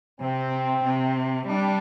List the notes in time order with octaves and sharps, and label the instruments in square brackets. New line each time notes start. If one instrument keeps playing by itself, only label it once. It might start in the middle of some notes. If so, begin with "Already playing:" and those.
[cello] C3 [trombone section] C4
[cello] C3
[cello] G3 [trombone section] D4